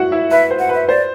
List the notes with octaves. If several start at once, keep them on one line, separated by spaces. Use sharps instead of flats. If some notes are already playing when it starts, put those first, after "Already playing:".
Already playing: E4 F#4 F#5
E4 E5
B4 E5
C5
F#5
B4 E5
C5 D5